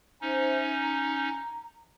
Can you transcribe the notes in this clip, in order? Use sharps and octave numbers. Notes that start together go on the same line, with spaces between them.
C#4 D#4 C5 E5
A#5